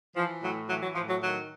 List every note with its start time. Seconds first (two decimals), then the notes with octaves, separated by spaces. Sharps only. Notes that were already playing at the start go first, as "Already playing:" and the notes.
0.16 E3 F3
0.42 A2 F#3
0.69 E3 F#3
0.82 F#3
0.95 A2 F3
1.09 F#3
1.22 D#3 F#3